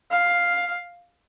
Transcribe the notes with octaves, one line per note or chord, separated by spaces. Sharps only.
F5